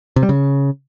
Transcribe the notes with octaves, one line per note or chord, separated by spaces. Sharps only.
C3
G3
C#3